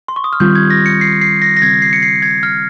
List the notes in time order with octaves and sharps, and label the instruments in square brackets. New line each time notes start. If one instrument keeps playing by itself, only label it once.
[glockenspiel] C6
C#6
D#6
F6
[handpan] D#3 G3 C4 F4 [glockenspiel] G6
[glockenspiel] G#6
A#6
C#7
C7
C7
A#6
A#6
[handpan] C#3 G3 C4 [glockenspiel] G#6
[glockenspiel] C7
C#7
C7
G#6
F6